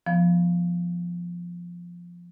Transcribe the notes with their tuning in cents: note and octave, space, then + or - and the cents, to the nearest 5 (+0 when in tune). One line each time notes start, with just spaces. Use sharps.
F3 +0 B3 +0